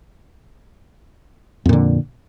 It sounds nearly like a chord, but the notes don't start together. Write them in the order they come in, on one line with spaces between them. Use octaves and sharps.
F2 A#2 D3